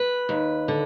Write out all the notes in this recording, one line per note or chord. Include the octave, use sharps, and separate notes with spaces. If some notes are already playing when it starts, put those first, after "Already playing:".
Already playing: B4
D#2
D3